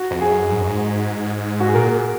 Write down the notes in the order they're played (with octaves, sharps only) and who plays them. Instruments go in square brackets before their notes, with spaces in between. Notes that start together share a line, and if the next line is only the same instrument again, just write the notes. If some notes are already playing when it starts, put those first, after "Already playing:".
Already playing: [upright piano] F#4
[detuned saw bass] F2
[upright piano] G#4
[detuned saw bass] F#2
G#2
F#2
G#2
[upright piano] F#4
G#4
[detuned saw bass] A#2 [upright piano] A#4